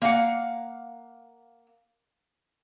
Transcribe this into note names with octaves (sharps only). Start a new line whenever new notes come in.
A#3 F5 F#5